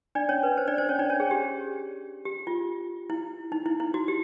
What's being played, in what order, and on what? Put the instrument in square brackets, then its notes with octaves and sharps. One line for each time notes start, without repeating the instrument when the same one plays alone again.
[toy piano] D4 D5
C#4 C#5
B4
C5
D4 D5
C5
C#4 C#5
D4 D5
C#4 C#5
G#4
G4
G4
F4
E4
D#4
E4
E4
F#4
G4